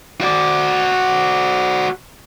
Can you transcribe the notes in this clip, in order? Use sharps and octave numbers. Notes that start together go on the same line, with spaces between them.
F#4 D5